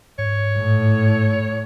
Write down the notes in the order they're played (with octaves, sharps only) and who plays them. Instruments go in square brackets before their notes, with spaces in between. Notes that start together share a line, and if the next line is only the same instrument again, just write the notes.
[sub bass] G#2 [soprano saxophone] C#5
[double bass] A2